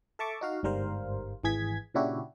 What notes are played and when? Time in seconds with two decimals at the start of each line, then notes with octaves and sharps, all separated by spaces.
0.19 A4 E5 A5 C#6 D6
0.41 D#4 F#4 F5
0.63 G1 G#2 G3 A#4 C5 F5
1.44 G#1 E3 G#4 G#6 B6
1.94 A#2 C#3 D4 E4 F#4 G4